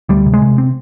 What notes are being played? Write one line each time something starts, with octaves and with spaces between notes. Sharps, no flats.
D2 G3
C3
G#3
C3
C4